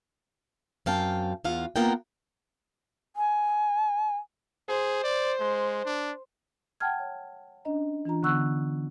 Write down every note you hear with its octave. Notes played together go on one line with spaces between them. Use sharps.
F#2 C3 F5 G5 A5
E2 F4 F5 F#5
A#3 B3 F4 A#4 F#5 G5
G#5
G#4 C5
D5
G#3
D4
F#5 G5 A5 F6 G#6
C#5
C#4 D4 D#5 A#5
E3 D4 F4 A#5
D3 B3 F#5 C#6 E6 F#6